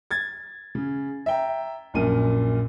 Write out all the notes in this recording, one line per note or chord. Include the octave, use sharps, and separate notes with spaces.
G#6 A6
C#3
E5 G5 A#5
A#1 F#2 A#2 D#7